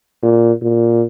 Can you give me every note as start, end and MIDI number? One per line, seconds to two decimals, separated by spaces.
0.23 0.52 46
0.62 1.04 46